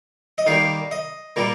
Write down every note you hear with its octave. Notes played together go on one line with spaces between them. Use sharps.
D#5
D#3 G3 A#3 F5
D#5
A#2 G3 A#3